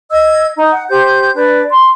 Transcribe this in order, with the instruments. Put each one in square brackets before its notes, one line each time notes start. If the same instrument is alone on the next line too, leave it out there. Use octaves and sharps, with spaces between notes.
[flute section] D#5 E6 G#6
D#4
F#5
G4 C5 G6
D4 B4 D5
C6